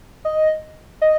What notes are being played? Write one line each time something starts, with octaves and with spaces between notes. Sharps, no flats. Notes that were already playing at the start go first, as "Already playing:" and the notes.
D#5
D#5